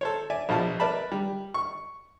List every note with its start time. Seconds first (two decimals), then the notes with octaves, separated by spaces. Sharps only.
0.01 A4 C5 C#5
0.30 D5 E5 G#5
0.49 A#1 B2 F3 E5 A5
0.80 A#4 B4 D5 E5 A5 B5
1.12 G3
1.54 C#6